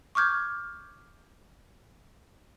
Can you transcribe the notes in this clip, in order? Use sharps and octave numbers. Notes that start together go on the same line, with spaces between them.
C#6 D6 F6 G6 G#6